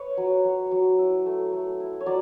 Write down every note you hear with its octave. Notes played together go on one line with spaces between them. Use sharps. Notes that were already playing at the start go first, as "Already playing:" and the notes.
Already playing: B4 C#5
F#3
F#3
F#3
E4
A3
A3
E4
C#5
F#3 D5